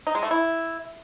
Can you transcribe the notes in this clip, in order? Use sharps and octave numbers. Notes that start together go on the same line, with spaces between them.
D#4
G#3
A3
E4